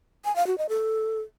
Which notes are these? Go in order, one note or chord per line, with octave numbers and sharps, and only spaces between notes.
G#5
F5
F#4
D#5
A4